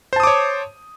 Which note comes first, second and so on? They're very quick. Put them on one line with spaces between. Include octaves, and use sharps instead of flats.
C5 A5 D#6 D6 C#5